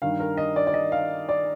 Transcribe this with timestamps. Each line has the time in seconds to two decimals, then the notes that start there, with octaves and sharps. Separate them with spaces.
0.02 G2 D#3 F5
0.20 A#4
0.37 D#5
0.56 D5
0.67 D5
0.74 D#5
0.92 F5
1.29 D5